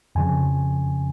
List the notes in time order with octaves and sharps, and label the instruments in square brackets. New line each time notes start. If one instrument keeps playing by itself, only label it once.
[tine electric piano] F2 C#3 F3 G#5